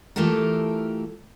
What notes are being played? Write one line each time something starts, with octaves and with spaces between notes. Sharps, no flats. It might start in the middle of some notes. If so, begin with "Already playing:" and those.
E3 A3 F4 G4 A4 A#4